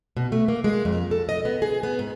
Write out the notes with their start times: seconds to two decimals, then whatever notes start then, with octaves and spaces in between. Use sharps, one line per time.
0.17 B2
0.32 A3
0.48 A#3
0.64 G#3
0.85 F2
1.11 A4
1.29 D#5
1.45 B3
1.62 G#4
1.83 B3
1.99 G#2